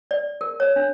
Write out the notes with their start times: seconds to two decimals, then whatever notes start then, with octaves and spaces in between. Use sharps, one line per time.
0.11 D5
0.41 A#4
0.60 C#5
0.76 D4